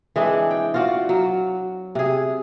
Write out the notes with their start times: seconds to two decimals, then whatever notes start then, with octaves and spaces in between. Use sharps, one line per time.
0.16 E3 G#3 C4 D4
0.51 G5
0.74 F4 F#4 D5
1.09 F#3
1.95 C3 G#4